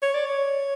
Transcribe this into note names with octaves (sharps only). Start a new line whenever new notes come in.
C#5
D5
C#5